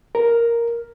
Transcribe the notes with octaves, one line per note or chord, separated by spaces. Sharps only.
A#4